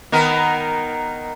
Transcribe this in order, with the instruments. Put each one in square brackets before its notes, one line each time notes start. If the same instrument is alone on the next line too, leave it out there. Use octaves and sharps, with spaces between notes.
[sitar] D#3 B3 A#4